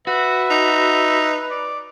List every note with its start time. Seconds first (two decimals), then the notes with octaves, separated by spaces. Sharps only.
0.07 F#4 B4 E5
0.51 D#4
1.50 D5